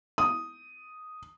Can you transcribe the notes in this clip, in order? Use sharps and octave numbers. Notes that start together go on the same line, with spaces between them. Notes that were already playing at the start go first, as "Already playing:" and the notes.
D#6